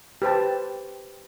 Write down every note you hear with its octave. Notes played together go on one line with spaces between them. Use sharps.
G4 B4 C5 A5